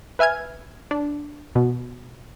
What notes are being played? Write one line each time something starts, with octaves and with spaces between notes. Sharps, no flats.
B4 E5 G#5 F6 G#6
D4
B2